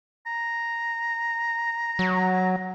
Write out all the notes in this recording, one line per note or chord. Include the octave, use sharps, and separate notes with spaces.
A#5
F#3